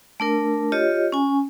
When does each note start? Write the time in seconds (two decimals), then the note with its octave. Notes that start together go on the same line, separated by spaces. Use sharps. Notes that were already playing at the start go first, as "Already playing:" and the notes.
0.20 A3 D4 A#4
0.72 F4 G4 C#5 D#5
1.12 C#4 G#5